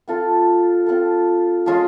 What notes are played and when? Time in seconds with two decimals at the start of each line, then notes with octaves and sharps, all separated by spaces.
0.08 C4 F4 A4
0.86 C4 F4 A4
1.66 F3 G#3 C#4 F4